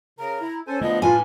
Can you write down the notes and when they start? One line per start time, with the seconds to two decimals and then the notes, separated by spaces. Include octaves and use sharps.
0.19 C#3 A#4 A#5
0.41 E4
0.67 C#4 A4 C5 G#5
0.81 D3 F3 A3 B3 D4 D#5
1.02 A2 D4 F4 B4 G#5